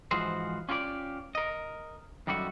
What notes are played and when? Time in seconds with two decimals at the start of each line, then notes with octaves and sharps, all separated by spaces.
0.11 G#2 E3 F3 F#4 G#4 C5
0.69 C#4 F4 G4 B4 D5
1.35 A#4 D#5
2.27 F#2 D#3 G3 A3 F#4